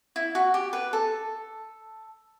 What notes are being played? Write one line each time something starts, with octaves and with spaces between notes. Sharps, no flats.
E4
F#4
G4
B4
A4